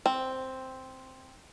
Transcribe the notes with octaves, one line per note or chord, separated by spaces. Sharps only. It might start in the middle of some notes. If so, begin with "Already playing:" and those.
C4